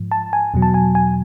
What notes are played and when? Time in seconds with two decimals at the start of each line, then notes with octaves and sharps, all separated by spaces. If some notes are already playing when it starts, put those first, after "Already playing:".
Already playing: G#2 F3
0.12 A5
0.33 G#5
0.54 E2 B2 F#3
0.62 A5
0.74 G#5
0.95 G#5